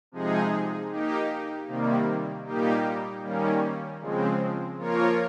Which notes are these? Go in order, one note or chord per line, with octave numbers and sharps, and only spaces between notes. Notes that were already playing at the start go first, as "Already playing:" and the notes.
C3 F3 G#3 D#4 G#4
A#3 D#4 G4
C3 D#3 G3 A#3
A#2 G3 A#3 D#4 G4
D#3 G3 A#3 C#4
C#3 F3 G#3 C4
F3 A#3 F4 A#4 C#5